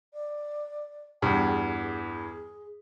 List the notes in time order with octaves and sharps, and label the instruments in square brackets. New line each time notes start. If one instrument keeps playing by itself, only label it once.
[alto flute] D5
[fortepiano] E2 G2 [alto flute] G5
[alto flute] G#4